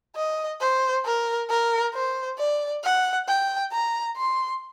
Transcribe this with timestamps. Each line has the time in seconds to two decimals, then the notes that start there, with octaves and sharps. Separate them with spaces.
0.16 D#5
0.61 C5
1.05 A#4
1.50 A#4
1.94 C5
2.39 D5
2.84 F#5
3.28 G5
3.72 A#5
4.17 C6